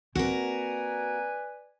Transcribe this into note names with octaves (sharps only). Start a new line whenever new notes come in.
A#3 C4 F#4 A#4 B4 D5 G#5